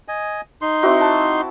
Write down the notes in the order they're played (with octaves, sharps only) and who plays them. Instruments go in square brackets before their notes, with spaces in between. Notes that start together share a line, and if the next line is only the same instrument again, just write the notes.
[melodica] D#5 G#5
D#4 C6
[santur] C4 E4 F#4
A5